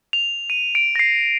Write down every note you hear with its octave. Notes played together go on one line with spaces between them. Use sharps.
F7
D#7
D7
A#6
C7